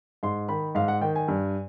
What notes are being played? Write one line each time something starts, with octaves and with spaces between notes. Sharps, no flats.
G#2 C6
D#3 B5
G#2 F5
F#5
D#3 G5
G#5
G2